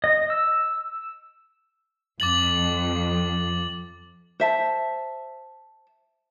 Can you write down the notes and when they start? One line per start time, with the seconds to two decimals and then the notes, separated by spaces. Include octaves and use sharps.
0.04 D#5
0.30 E6
2.20 F2 D6 A6 F#7
4.40 C5 E5 A5